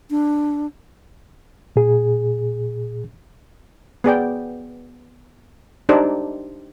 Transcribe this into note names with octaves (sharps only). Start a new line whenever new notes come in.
D4
A#2 G#4
B3 G#4 D5 G5
D4 D#4 G4 A4 C5 D5